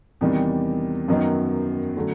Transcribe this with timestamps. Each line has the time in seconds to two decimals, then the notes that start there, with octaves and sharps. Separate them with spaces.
0.21 E2 C3 D#3 G3
1.08 F#2 D#3 F#3 B3 D#4
1.97 D3 F#3 A3 C#4